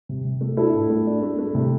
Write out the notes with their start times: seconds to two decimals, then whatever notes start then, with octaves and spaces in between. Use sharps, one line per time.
0.09 C3
0.25 C3
0.41 A3
0.57 D4 E4 A4
0.74 A2
0.90 A3
1.07 D4
1.22 A3
1.39 A3
1.55 C3